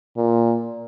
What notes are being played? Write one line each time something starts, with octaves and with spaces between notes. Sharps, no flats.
A#2